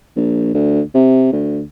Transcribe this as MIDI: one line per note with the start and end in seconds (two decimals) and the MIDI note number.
0.17 0.52 34
0.54 0.81 38
0.94 1.32 48
1.33 1.61 38